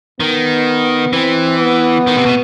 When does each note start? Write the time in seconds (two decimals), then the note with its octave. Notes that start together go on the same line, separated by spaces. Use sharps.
0.19 D#3 B3
1.13 E3 C4
1.60 B3
2.07 D#3
2.16 C3
2.26 B2